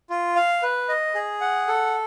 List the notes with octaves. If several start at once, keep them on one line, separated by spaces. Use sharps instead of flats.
F4
F5
B4
D#5
G#4
F#5
A4